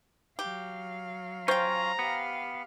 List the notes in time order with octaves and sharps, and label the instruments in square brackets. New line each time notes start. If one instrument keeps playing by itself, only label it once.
[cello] F#3 F5 [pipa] G4
[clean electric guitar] C#4 F4 [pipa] C5 G5 [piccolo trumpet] A#5
[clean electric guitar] B3 [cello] G4 F5